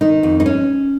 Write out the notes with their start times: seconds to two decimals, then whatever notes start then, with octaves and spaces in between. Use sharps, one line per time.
0.01 D#3 D#4
0.23 F2
0.40 D#4
0.46 C#4